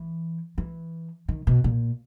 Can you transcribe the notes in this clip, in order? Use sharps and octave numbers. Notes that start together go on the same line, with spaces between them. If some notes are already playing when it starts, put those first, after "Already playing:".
Already playing: E3
E3
D#3
B2
A#2